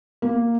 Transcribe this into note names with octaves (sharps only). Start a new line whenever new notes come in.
A#3